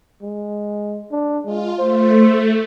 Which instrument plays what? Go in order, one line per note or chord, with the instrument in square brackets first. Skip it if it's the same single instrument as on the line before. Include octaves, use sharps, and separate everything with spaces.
[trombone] G#3
D4
[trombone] G#3 [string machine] F4
[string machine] A3 [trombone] C5